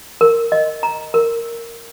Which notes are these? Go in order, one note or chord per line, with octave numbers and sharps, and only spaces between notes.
A#4
D#5
A#5
A#4